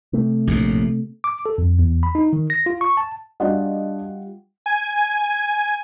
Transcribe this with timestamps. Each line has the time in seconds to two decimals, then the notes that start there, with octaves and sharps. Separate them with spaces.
0.13 C3 A3
0.47 A#1 D#2 A2
1.24 D6
1.46 A4
1.58 F2
1.79 E2
2.03 B5
2.15 D#4
2.33 D#3
2.50 A#6
2.66 F4
2.81 C#6
2.97 A5
3.40 G3 D4 F4 F#4 D#5 F#5
4.66 G#5